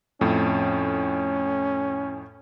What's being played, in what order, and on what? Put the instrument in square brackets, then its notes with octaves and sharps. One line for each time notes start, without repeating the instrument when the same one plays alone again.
[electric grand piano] F2 A2 [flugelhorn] C#4